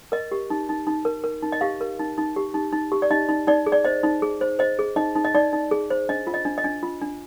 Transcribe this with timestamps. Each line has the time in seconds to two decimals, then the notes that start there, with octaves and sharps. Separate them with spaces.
0.12 A#4 D#5
0.32 G4
0.50 D#4
0.69 D#4
0.87 D#4
1.05 A#4
1.24 A#4
1.42 D#4
1.52 D#5
1.61 G4 F5
1.81 A#4
1.99 D#4
2.18 D#4
2.36 G4
2.54 D#4
2.73 D#4
2.92 G4
3.02 D5
3.11 D#4 D#5
3.29 D#4
3.47 D#4 D5
3.66 G#4
3.72 D5
3.85 C5 D#5
4.03 D#4
4.22 G#4
4.41 C5
4.59 C5 D#5
4.79 G#4
4.96 D#4 D#5
5.15 D#4
5.25 D#5
5.35 D#4 D5
5.53 D#4
5.71 G#4
5.90 C5
6.09 D4 D#5
6.27 F4
6.34 D#5
6.45 D4
6.58 D#5
6.64 D4
6.83 F4
7.01 D4